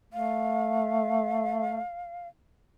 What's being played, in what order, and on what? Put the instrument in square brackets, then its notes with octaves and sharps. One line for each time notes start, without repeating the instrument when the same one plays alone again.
[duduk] A3 [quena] F5